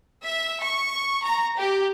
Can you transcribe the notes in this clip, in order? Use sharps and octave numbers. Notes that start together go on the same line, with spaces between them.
E5
C#6
A#5
G4